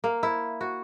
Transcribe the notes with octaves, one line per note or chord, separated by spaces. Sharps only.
A#3
E4
F#4